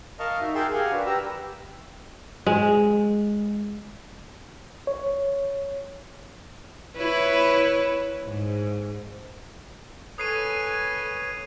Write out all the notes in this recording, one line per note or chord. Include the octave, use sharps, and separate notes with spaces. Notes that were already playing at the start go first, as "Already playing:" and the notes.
A#4 D#5 F5 A5 C#6 F6
D#4 F#4 E5
G#4 A#4 G5 A5 C6 E6
G4 A#4 F5 F#5 G#5
D4 F#4 B4
G4 B4 A#5 E6
G#3
C#5
E4 B4 C#5
G#2
A4 B4 C#5 G#5 D#6 C7 D#7